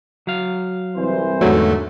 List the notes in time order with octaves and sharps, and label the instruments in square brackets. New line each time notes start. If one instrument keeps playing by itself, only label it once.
[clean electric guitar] F#3 F5
[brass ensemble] C2 E3 C5
[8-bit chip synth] E2 A3 [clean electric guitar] G#2 D3 A#3 [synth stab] F#3